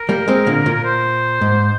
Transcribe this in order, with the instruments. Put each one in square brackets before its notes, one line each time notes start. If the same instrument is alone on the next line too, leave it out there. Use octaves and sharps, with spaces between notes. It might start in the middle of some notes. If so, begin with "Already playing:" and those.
Already playing: [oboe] A#4
[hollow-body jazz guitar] G3 A#3
G#3 C4
A#2 D3
A#2
[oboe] A#4
C5
[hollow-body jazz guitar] G#2